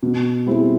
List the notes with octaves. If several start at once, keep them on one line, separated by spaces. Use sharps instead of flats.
B2
G3 C4 E4 G#4